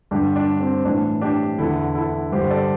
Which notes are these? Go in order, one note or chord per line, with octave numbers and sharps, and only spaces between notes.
G2 D3 D4 G4
D4
C4
A2 E3 D4
D4 G4
E2 D3 E4 A4
E4 A4
G2 D3 G4 C5
A4 D5